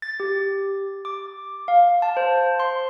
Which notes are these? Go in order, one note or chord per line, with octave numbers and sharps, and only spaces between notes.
A6
G4
D6
F5
A5
C5
C6